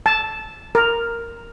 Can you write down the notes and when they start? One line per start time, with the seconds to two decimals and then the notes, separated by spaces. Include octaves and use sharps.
0.06 A5
0.75 A#4